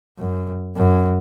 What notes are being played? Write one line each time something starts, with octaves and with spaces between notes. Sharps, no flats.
F#2
F#2